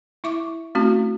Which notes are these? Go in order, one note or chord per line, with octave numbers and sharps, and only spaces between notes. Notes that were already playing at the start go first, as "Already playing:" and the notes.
E4 E5 C#6 D6
A3 C4 C#4 E4 F#4